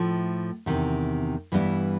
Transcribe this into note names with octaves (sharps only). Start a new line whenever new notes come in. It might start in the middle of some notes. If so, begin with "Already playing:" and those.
Already playing: A2 F3 A3
E2 C3 D#3
G2 E3 G3 B3 E4